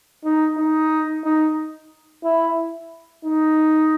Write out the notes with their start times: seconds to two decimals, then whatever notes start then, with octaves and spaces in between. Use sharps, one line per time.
0.24 D#4
0.58 D#4
1.24 D#4
2.24 E4
3.25 D#4